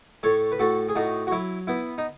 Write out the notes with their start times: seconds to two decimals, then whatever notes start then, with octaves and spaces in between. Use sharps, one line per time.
0.23 A2 A4 C#5
0.52 B4
0.59 A2 F#4 A4
0.89 G#4
0.95 A2 D#4 F#4
1.27 F#4
1.32 F#3 E4
1.67 B3 E4
1.98 D#4